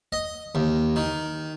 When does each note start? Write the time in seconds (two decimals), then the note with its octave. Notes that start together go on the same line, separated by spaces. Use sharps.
0.13 D#5
0.55 D#2
0.96 D#3